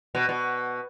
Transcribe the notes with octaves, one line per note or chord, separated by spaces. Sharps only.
B2
B2